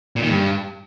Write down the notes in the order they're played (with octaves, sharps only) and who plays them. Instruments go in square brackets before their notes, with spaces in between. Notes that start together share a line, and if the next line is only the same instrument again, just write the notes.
[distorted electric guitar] A#2
D#3
G2